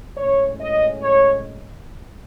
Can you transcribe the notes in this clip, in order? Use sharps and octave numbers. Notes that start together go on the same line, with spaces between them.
A2 G#3 C#4 C#5
D#5
C#5